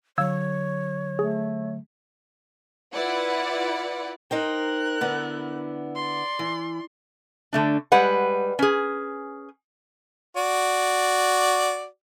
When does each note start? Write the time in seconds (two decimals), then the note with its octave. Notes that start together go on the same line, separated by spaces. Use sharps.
0.18 D3 F#3 C#5 F5 E6 G#6
1.19 A3 G#4
2.93 E4 F4 B4 D5 F#5
4.31 D#4 A#4 C5 G5 F#6
5.01 D3 B3 E4
5.95 D5 C6
6.39 E3
7.53 D3 A3 D4
7.92 G3 G#3 B4 F#5
8.59 C#4 G#4
10.37 F#4 D5